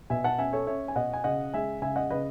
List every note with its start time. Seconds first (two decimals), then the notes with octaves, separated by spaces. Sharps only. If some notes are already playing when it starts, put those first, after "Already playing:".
0.10 B2 E5 G#5
0.24 F#5 A5
0.38 C#4 E5 G#5
0.53 A4 C#5
0.67 C#4 C#5 E5
0.88 G#5
0.96 B2 D#5 F#5
1.13 G#5
1.24 C#3 D#5 F#5
1.54 G#3 E5 G#5
1.82 C#3 E5 G#5
1.96 D#5 F#5
2.10 C#3 B4 D#5